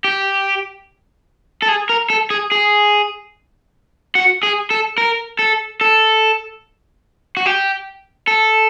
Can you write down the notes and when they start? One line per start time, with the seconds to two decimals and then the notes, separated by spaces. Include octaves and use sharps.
0.04 G4
1.62 A4
1.68 G#4
1.89 A#4
2.10 A4
2.30 G#4
2.52 G#4
4.15 F#4
4.43 G#4
4.71 A4
4.98 A#4
5.39 A4
5.81 A4
7.37 F#4
7.46 G4
8.27 A4